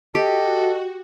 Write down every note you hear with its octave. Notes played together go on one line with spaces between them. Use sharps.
F#4 G4 A4 D#5